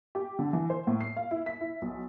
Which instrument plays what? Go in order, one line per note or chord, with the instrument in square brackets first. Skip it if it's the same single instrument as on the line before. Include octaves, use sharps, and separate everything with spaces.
[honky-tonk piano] G4
D3
E3
C5
A2
C7
F5
E4
B6
E4
B1